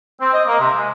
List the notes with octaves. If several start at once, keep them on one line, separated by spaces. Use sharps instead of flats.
C4
D#5
A#3
C3
G#3